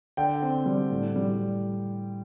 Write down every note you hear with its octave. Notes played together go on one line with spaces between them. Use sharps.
D3 G5
C4
G3
A2
G3